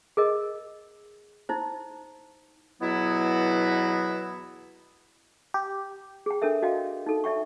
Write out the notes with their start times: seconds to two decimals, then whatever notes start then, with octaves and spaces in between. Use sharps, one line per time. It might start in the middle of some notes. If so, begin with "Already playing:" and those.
0.17 G#4 A#4 D#5
1.49 D#4 E4 C5
2.81 E2 B2 F#3 B3 E4
5.54 G4
6.26 G#4 G5
6.42 D4 A4 A#4 E5
6.62 F#4 D#5 F5 G5
7.06 D#4 A4
7.24 D5 E5 G5 C#6